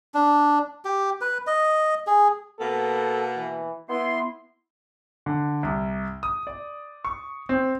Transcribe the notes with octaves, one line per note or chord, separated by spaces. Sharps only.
D4
G4
B4
D#5
G#4
B2 A#3 B3 A4
E3
B3 E4 C6
D3
C2
D#6
D5
C#6
C4